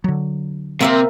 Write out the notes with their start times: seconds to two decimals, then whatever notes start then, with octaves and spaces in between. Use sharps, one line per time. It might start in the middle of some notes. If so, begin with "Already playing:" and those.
0.04 D3 F#3
0.81 C3 A#3 C4 E5 F5